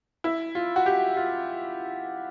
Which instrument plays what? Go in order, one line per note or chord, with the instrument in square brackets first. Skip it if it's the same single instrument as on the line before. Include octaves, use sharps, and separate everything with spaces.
[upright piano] E4
F4
F#4
G4
F4